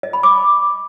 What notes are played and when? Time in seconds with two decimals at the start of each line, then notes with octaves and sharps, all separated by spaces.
0.03 D#5
0.13 B5
0.23 D6